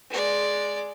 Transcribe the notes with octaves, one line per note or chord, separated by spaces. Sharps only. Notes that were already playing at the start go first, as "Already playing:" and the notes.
G#3 D5